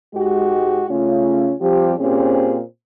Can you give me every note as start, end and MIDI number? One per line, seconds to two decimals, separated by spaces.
0.15 0.84 44
0.15 0.84 56
0.15 0.84 66
0.15 0.84 67
0.90 1.53 49
0.90 1.53 57
0.90 1.53 61
0.90 1.53 65
1.61 1.93 53
1.61 1.93 55
1.61 1.93 60
1.61 1.93 67
1.99 2.59 46
1.99 2.59 60
1.99 2.59 61
1.99 2.59 67
1.99 2.59 68
1.99 2.59 72